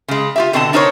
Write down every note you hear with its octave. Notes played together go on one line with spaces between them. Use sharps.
C#3 G#3
F4 G4 E5
B2 D3 C4 D#5 G#5 A5
D4 D#4 A#4 C5 C#5